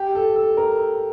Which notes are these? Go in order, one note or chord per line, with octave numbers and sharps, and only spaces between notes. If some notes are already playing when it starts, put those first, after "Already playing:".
Already playing: G4
A4
A4
A#4